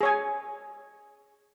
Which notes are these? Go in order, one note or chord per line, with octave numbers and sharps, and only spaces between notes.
G#4 C#5 G#5